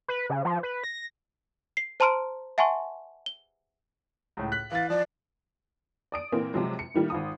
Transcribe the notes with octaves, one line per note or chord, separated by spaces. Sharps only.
B4
C#3
F3
B4
A#6
C7
C5 A5 A#5 C6 F6 D7
E5 F#5 G#5 A5 C6 C#6
G7
C#2 A2
F#6 B6
E3 F5 A6
F3 D5
D5 D#6 D7
A#2 E3 A#3 C4
C3 F3 F#3 G#3
C#7
A2 D#3 G3 A#3
G#1 F4 D#6